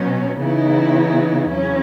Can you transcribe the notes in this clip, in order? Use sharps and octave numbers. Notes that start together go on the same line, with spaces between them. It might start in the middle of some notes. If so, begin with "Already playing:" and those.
Already playing: B2 F#3 C#4
C#3 E3 B3 D#4 E4
E2 C#3 F#3 C#4